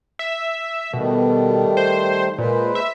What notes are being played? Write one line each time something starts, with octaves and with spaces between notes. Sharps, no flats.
E5
B2 D#3 G3 A3
C5
A#2 G#3 B4 C5
E5